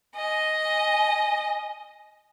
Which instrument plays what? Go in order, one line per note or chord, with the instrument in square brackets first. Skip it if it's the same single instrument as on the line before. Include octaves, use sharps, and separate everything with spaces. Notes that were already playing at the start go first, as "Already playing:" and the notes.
[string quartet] D#5 [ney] G#5